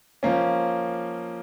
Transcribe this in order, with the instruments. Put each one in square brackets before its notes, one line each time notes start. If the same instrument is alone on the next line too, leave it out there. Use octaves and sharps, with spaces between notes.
[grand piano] F3 A#3 C#4